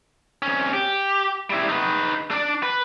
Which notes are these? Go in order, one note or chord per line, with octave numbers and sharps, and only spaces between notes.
C2 C#4
G4
G3 E4
D#4 B4
D4 D5
B4